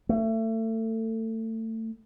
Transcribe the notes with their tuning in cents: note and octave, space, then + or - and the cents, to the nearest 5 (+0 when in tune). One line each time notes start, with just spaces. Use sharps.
A3 +25